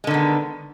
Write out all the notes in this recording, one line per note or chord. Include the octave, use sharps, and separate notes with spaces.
D3 D#3 G#3 B3